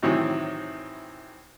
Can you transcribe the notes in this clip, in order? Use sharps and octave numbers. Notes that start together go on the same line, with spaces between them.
A2 C3 D#3 E3 F#3